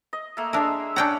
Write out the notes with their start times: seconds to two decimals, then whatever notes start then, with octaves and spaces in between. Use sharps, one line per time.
0.13 D#5
0.37 A3 A#3
0.53 G#3 D4 A#4 E5
0.96 C#4 D4 F#5 G5 A#5